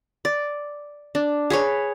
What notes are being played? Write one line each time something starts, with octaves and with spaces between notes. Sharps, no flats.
D5
D4
G#4 B4 C#5